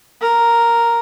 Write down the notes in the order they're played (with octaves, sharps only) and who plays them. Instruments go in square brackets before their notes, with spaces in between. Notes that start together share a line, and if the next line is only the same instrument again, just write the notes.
[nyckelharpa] A#4